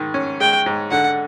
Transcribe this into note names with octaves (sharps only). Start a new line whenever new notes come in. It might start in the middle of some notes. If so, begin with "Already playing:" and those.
Already playing: G#2 D#3
C#4
G#3 G5
G#2
D3 F#5